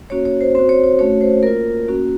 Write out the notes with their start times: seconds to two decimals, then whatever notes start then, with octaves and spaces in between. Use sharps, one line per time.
0.10 A#3 C#4 F#4 C#5
0.25 C#5
0.41 C5
0.55 C4 C5
0.59 F#4
0.69 C#5
0.84 C#5
0.99 A3 C#4 F#4 C#5
1.21 C5
1.43 A#3 F4 A#4
1.88 A#3 C#4 F#4